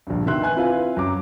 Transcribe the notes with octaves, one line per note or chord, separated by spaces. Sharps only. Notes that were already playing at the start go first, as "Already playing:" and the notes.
A#1 G2
B2 D#3 E5 C6 F#6
B4 G#5 F#6
C4 E4 F4 B4 F5 G#5
F#2 A#5 D6